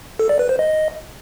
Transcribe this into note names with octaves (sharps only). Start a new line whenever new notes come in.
A4
D5
B4
C5
D#5